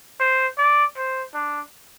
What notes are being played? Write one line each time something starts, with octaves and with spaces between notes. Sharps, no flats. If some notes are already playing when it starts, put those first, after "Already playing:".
C5
D5
C5
D4